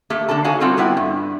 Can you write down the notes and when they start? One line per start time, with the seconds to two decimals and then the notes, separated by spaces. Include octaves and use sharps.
0.10 A3 A#3 G4 A4
0.29 D3 D4 A4 A5
0.44 D#4 F#4 A4 C#5 F5 G#5
0.60 F#3 G3 C4 F4 F#4 A4
0.77 G3 B3 E4 F#5 G5
0.97 G2